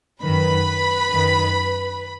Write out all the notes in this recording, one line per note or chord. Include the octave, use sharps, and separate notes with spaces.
F#2 D#3 B4 B5
F#2 D#3